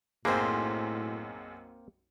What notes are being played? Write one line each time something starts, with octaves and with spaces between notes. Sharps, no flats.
B1 F#2 A2 A#3 C4 G#4 C5